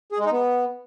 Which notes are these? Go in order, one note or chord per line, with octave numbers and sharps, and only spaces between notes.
G#4
G#3
D#4
B3